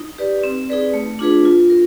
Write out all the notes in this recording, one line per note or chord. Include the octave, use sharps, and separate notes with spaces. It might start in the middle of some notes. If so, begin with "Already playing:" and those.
Already playing: D#4
G4 B4 D5
C4
D#4 G#4 B4 D5
A3
D4 F4 G#4 B4
F4
A#4